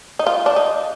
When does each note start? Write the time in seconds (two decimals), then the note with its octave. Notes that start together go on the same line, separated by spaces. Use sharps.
0.19 D#4
0.27 F4
0.46 D4
0.56 D#4